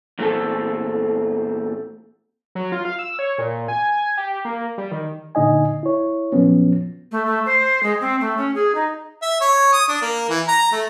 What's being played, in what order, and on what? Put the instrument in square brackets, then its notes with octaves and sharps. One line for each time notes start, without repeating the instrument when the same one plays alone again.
[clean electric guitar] E2 A#2 A3 C4 A4
[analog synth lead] F#3
F4
F5
E6
C#5
A#2
G#5
G4
A#3
G3
D#3
[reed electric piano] A#2 D3 D#4 D#5 G#5
E4 C#5
A#2 F3 F#3 B3 C#4
[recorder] A3
A3
C5
G#3
C4
A3
C#4
G#4
D#4
[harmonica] E5
C#5
D#6
D4
A#3
E3
A#5
A3